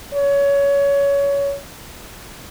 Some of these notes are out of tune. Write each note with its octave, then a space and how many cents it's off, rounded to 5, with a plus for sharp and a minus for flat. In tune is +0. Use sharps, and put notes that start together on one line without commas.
C#5 +20